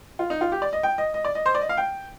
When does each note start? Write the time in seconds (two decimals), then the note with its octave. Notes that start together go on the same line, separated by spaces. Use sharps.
0.19 F4
0.30 D#4
0.41 F4
0.52 G4
0.62 D5
0.73 D#5
0.83 G5
0.98 D#5
1.14 D#5
1.25 D5
1.35 D#5
1.46 C5
1.55 D5
1.61 D#5
1.69 F5
1.77 G5